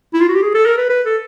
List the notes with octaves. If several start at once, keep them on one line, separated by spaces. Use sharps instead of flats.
E4
F4
F#4
G4
G#4
A4
A#4
B4
B4
A4